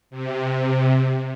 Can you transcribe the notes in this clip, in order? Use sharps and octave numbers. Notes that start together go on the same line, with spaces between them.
C3